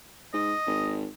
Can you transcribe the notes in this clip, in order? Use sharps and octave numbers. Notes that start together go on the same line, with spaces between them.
G#2 D#5
G#1